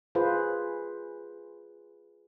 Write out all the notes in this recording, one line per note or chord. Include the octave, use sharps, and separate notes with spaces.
F4 G#4 B4 C5